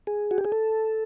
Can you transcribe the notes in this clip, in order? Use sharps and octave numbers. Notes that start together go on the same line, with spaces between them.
G#4
F#4
G4
G#4
A4